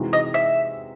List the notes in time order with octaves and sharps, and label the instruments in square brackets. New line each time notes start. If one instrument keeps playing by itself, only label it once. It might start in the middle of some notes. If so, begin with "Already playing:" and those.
Already playing: [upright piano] C3 E3 G#3 D#4 F#4
[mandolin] D#5
E5